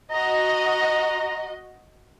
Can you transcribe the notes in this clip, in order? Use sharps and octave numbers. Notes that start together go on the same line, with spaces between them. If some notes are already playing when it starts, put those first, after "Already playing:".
F#4 D#5 A#5